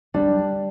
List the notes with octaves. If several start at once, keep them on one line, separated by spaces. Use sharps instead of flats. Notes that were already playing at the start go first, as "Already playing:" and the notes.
G3 D4